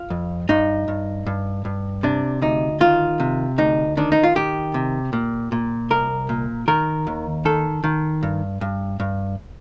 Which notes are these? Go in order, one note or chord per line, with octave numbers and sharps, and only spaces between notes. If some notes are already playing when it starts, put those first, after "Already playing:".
Already playing: F4
F2
G2 D#4
G2
G2
G2
C3 D4
D2 D#4
D#3 F4
C3
D2 D#4
D#3 D4
D#4
F4
D#3 G4
C3
A#2
A#2
C2 A#4
A#2
D#3 A#4
D#2
D#3 A4
D#3
G2
G2
G2